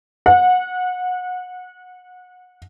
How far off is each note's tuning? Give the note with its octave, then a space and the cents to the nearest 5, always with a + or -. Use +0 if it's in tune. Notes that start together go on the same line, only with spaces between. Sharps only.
F#5 -25